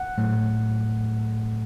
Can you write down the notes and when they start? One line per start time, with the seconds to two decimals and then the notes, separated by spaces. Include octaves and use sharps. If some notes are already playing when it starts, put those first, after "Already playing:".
Already playing: F#5
0.18 A2 F#3 A3